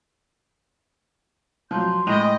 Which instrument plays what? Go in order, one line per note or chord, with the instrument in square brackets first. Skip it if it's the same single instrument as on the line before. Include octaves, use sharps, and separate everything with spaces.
[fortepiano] F3 F#3 [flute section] C6 G6
[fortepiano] A2 [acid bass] G#3 [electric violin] D#5 G5